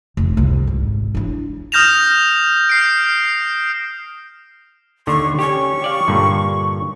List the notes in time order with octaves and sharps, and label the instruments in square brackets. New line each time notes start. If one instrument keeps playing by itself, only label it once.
[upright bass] F1
C2
G#1
D4 E4
[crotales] D#6 F6 G6 A#6 E7 F7
F6 C7 D7
[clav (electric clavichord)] D#2 D3 [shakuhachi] C#6
[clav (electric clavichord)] C#4 G4 [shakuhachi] C#6
[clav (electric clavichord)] G4 D5 F5
G2 A#2 D3